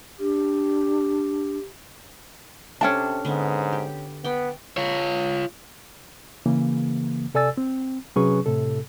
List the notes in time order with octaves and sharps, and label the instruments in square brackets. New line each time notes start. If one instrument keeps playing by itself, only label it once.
[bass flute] D4 [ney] G4
[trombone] C3 [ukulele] C#4 G5 A5 [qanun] D4 A4
[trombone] G#2 [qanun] D3 B3
[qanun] G4
[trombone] B3 [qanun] D5 G5
[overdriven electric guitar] F4 C#5
[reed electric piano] C#3 E3 A#3
C3 A4 D5 G#5 E6 A6
C4
C3 F#3 C#4 G#4 B4 C#6
A2 C3 A4